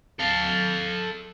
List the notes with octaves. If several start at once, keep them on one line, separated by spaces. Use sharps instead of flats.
A4 F5